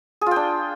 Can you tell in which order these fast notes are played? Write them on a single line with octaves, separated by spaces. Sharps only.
G#4 F4 G5 D4